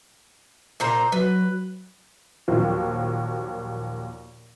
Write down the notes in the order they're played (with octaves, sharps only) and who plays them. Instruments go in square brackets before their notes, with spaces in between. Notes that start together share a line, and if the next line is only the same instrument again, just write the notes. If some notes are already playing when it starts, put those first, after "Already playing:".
[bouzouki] A#2 C5 A#5
[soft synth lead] F#3 [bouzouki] B4
[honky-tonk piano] D#2 A#2 F3 F#3